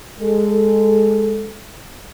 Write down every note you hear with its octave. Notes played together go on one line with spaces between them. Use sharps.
G#3 A4